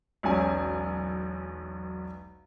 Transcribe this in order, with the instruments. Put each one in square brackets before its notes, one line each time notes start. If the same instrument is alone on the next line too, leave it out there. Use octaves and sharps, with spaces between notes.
[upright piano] E1 B1 C#4 G#5